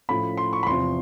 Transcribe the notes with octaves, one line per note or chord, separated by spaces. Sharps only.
A2 F3 A3 C#4 B5
C6
C#6
B5
E2 C3 F3 C6